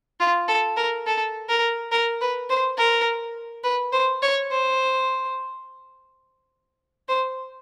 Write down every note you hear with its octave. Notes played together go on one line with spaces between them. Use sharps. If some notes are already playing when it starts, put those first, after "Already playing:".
F4
A4
A#4
A4
A#4
A#4
B4
C5
A#4
B4
C5
C#5
C5
C5